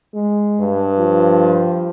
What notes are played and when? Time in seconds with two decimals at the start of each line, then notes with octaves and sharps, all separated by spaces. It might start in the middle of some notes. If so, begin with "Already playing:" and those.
0.14 G#3
0.61 G2
0.99 F3